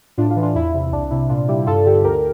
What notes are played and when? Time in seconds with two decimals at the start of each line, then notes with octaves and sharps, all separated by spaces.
0.18 A2 D4 F4
0.30 D4 F4
0.36 E3
0.43 D4 F4
0.55 E2 E4
0.74 C3
0.92 C2 D4
1.11 C3 E4
1.29 A#2 D4 F4
1.48 G3 E4 G4
1.67 G2 F4 A4
1.85 D3 G4
1.94 A4
2.04 D2 G4 A#4